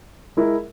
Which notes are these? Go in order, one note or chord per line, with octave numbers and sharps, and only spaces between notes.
G#3 E4 A#4